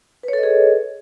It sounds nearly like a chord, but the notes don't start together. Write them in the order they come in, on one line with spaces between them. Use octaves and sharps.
B4 C#5 A4 D#5 G#4